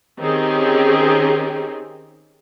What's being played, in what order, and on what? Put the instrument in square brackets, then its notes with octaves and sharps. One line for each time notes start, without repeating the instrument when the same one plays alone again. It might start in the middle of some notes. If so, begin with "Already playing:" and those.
[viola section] D#3 C4 C#4 G4 G#4